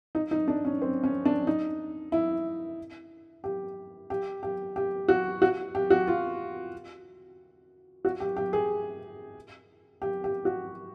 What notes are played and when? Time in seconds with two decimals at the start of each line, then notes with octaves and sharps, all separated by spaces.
0.15 D#4
0.31 D#4
0.48 D4
0.65 C#4
0.82 C4
1.04 C#4
1.25 D4
1.47 D#4
2.12 E4
3.44 G4
4.10 G4
4.43 G4
4.76 G4
5.08 F#4
5.42 F#4
5.75 G4
5.90 F#4
6.07 F4
8.05 F#4
8.20 G4
8.37 G4
8.53 G#4
10.02 G4
10.24 G4
10.45 F#4